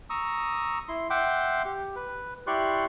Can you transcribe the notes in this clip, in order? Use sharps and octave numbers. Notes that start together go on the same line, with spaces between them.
A#5 C#6 D#6 E6
E4 C6
E5 F#5 G5 C6 D6
G4
B4
E4 G4 D5 C6 C#6 F#6